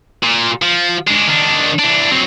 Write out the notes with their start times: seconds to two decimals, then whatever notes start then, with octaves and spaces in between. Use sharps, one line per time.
0.23 A#2
0.62 F3
1.07 G#3 D4
1.28 D#3 D4
1.79 E3 D4
2.11 F#3 C4